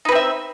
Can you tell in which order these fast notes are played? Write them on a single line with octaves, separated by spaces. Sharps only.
D#4 B4 C4 E5